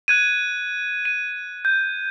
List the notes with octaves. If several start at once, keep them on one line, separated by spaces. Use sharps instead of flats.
F#6 G#6 D#7
D#7
G6